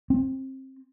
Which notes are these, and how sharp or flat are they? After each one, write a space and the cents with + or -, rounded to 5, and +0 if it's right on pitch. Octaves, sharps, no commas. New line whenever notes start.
C4 +20